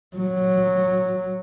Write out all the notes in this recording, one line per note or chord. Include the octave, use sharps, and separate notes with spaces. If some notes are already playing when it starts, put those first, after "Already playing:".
F#3